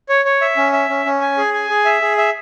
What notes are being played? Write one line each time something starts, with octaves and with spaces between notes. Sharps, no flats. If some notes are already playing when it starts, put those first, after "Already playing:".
C#5
C#5
E5
C#4
E5
C#4
C#4
G#5
G#4
G#5
G#4
E5
G#4
E5